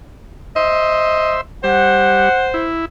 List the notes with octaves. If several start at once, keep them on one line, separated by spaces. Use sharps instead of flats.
C5 D#5 E5
G3 C5 F#5
E4